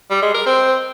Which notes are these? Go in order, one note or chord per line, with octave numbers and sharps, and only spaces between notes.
G3
G#3
A#4
C4